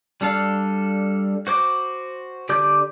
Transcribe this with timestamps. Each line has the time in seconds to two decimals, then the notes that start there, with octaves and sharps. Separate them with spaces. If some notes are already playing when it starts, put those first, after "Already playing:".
0.21 G3 D4 A4 F5
1.47 F#4 C5 D6
2.49 D3 G4 D5 D6 G6